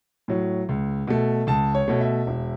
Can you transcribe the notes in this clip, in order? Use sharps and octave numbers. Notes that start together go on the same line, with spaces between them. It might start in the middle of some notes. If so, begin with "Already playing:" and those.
A2 F#3
C#2
B2 A3
C#2 A5
C#5
B2 A3
E5
E1